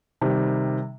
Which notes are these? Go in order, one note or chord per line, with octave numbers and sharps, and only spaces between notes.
C3 D#3 G3